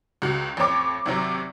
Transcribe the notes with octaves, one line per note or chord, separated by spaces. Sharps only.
C#2 F#4
A1 F2 C4 C#5 D6
G#1 C3 F#3